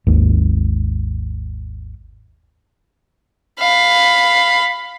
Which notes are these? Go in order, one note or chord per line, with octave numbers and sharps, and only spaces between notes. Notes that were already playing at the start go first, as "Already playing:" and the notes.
G#1 D#2
F5 B5